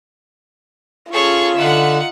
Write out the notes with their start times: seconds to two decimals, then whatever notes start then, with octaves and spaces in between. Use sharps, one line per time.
1.13 C#4 F4 G#4 A4 C#5 C#6
1.56 D3 D#4 E5 F#5 F#6